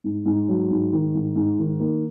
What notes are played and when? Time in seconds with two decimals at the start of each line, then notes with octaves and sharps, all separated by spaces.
0.04 G#2
0.26 G#2
0.49 F#3
0.71 G#2
0.93 D#3
1.15 G#2
1.36 G#2
1.59 D#3
1.80 A#3